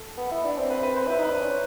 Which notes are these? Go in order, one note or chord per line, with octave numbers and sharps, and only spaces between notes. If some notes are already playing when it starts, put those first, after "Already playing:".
Already playing: A4
B3
E4
D4
C4
B4
B4
C5
E4 B4
D#4
B4
D4
C#4